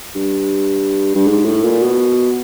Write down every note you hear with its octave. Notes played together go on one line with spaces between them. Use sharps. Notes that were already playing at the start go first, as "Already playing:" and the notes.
G2
G2
G#2
A2
A#2
B2